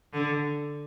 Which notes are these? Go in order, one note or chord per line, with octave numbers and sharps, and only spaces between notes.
D3